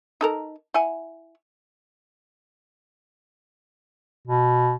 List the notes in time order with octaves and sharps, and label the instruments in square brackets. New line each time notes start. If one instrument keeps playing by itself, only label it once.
[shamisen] D#4 A4 A#4
E4 F#5 G#5
[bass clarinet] B2